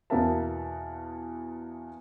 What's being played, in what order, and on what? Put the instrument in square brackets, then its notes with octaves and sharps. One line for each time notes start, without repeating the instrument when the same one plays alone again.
[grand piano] E2 B2 A#3 A#4 E5 A5